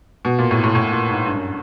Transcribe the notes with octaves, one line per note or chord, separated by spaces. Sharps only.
B2
A#2
A2
A2
A2
A#2
G#2
G2
F#2